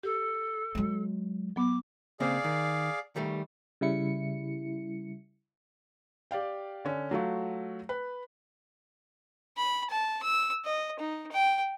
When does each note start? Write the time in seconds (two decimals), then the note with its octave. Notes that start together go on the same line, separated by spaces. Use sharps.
0.03 G4 A4
0.75 F#3 G#3
1.56 F#3 B3 D6
2.20 C#3 A#3 C4 G#4 D5 F5
2.44 D#3
3.16 D#3 G3 A3
3.81 C#3 G3 E4 C#7
6.31 G4 D5 F5 G5
6.85 D3 C#4
7.11 F#3 A3 F4 F#4
7.89 B4
9.57 B5
9.90 A5
10.23 E6
10.65 D#5
10.99 D#4
11.32 G5